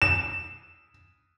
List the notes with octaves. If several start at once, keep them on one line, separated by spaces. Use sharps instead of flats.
E7